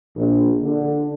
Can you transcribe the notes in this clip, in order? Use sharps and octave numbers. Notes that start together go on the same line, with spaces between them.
A#1
D3